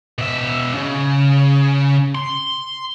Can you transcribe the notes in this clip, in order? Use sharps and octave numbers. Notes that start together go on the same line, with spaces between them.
B2 E5
C#3
C6